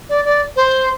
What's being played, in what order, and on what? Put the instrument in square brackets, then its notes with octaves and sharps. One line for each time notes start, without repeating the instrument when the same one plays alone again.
[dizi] D5
D5
C5